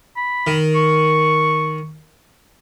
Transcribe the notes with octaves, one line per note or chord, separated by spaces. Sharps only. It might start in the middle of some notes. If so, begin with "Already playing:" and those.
B5
D#3
C#6